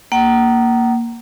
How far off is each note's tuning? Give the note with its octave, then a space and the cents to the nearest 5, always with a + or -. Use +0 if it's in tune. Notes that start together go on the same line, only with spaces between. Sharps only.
A#3 +0 F#5 +45